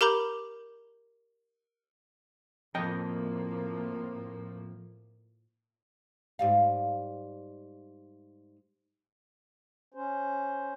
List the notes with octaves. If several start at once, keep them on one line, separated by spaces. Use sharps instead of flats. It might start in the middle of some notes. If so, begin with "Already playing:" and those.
G4 A#4 A#5 B5 D6 G6
F2 A2 F3 A#3 D#5 G5
G#2 G3 F5
C#4 C5